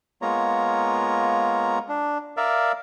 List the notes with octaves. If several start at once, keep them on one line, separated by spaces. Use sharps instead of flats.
G#3 A#3 B3 F4 C#5 A#5
D4
A#4 D5 E5 F5